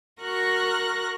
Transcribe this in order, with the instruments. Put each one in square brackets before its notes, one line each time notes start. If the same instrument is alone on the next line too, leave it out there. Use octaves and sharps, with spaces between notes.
[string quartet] F#4 A#4 C#6 F#6 A#6